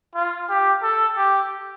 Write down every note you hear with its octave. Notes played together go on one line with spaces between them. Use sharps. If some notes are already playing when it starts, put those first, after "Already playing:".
F4
G4
A4
G4